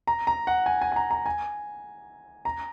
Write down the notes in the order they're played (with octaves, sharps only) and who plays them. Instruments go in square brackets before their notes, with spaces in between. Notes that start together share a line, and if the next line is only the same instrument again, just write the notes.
[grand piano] A#5
A#5
F#5
G#5
G#5
G#5
A#5
A#5
G#5
A#5